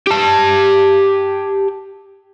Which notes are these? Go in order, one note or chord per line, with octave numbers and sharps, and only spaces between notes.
G4 A5